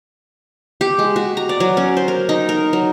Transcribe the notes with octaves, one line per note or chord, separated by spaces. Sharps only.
G4
G#3
F#4
A#5
D5
F#3
C#4
C5
A#4
D#4
A#4
F#3